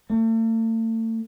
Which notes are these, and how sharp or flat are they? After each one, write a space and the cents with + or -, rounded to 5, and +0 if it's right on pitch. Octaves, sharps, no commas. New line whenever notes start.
A3 +40